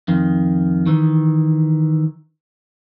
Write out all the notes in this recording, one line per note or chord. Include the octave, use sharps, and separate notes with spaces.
F2 D#3
D#3 E3